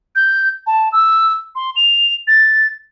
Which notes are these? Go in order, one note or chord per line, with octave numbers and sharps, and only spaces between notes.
G6
A5
E6
C6
F7
A6